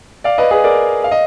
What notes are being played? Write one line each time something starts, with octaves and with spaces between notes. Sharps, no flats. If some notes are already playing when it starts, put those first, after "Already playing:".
D5 F5
B4 D#5
G#4 B4
A#4 D5
F5
D#5